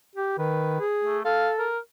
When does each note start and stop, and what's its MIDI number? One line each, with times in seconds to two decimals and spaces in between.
0.15 0.35 67
0.38 0.77 51
0.38 0.82 71
0.80 1.19 68
1.04 1.22 57
1.25 1.69 69
1.25 1.49 77
1.59 1.78 70